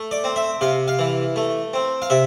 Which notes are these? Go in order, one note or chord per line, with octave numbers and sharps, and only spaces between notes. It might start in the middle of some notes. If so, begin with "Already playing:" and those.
Already playing: A3
D5
C4
E5
C3 F5
F5
E3
A3
C4
F5
C3 E5